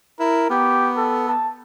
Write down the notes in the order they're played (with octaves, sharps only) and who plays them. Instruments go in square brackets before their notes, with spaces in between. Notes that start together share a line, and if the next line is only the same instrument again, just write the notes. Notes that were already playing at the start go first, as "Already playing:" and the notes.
[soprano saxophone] E4 [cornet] A#4
[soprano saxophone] B3 [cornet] G4
[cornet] A4
A5